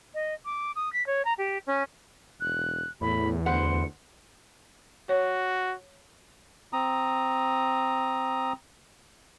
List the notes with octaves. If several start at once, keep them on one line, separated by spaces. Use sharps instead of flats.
D#5
D6
D#6
B6
C#5
A#5
G4
C#4
E1 F#6
E2 A2 B5
D2 B4 C5 F#5 C#7
F#4 C#5
C4 A#5 D#6